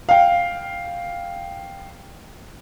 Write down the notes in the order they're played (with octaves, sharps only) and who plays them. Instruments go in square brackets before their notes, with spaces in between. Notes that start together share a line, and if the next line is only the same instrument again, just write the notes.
[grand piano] F5 G5